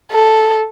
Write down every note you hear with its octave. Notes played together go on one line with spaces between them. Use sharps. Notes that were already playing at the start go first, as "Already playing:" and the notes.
A4